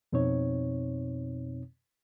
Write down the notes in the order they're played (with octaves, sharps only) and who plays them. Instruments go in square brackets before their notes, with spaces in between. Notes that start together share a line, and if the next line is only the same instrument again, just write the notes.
[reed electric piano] F2 B2 C4 D#4 C#5